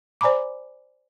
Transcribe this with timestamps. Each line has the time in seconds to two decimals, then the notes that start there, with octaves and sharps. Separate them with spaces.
0.21 C5 D5 G#5 A#5 B5 D6